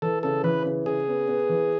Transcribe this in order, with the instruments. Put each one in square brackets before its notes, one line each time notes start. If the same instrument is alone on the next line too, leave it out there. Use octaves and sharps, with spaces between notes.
[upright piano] E3 [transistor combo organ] A4
[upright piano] C#3 [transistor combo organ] A4
[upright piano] E3 [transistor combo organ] B4
[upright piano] C#3
[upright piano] C#3 [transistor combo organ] G#4
[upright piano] B3
B3
E3